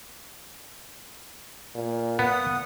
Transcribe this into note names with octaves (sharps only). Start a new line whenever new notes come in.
A#2
B3 F#5 D#6